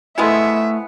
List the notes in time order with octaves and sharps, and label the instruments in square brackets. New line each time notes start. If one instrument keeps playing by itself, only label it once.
[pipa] F3 G#3 B3 [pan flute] A3 [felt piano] E4 A4 [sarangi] E5